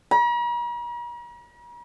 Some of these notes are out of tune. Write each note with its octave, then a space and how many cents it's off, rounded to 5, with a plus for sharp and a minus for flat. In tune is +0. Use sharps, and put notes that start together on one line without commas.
A#5 +45